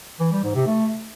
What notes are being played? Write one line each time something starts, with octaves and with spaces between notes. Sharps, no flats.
E3
G3
G#2
C3
A3